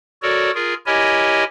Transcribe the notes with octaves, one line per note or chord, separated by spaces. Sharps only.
F#4 A4 A#4 C#5 D5
F4 G#4 A#4
E4 G4 A#4 C#5 D#5 G#5